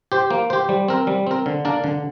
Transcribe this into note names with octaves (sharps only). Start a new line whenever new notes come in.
G4 C5
A#3
G4 C5
G3
C4 A#4
G3
C4 A#4
D3
A#3 D4 A#4 D5
D3